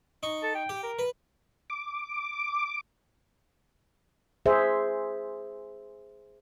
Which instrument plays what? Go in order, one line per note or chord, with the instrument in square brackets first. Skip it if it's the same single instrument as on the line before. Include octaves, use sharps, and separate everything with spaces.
[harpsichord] D#4 C#6
[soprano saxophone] A4
G5
[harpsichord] G4
[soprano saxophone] A#4
[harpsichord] B4
[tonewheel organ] D6
[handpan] G#4 C5 E5